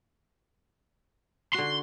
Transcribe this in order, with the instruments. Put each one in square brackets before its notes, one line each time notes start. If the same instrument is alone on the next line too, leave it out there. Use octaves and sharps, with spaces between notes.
[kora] D3 F#4 [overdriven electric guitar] C6